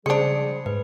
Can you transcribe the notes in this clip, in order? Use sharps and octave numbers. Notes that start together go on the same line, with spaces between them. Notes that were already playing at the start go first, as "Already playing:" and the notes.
C#3 F3 G3 G#3 D4 G#4 C5 C#7
G#2 B4